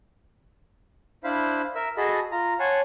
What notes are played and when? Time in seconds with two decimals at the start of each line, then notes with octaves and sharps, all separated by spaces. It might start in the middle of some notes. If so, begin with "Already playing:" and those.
1.24 D4 E4 C5 F5 B5
1.75 A#4 E5 E6
1.97 F#4 G#4 A4 D#5 A5 B5
2.32 F4 A#5
2.59 C#5 F#5 G#5 A5 C6